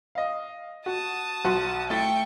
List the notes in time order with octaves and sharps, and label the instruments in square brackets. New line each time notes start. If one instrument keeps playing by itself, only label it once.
[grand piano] D#5 F5
[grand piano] F#4 [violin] A5 D#6
[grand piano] B1 F#4 C6
[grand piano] A3 E4 A6 [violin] G5 C#6